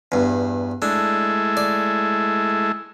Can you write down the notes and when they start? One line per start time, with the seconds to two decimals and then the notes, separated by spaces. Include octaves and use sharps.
0.12 E2 G2
0.82 G#3 A3 D4 E4
1.57 D5